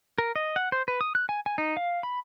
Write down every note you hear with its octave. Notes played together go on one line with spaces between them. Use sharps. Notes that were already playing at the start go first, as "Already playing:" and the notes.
A#4
D#5
F#5
C5
B4
D#6
F#6
G#5
G#5
D#4
F5
B5